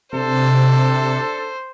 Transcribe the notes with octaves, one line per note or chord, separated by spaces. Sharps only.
C3 D4 A4 C5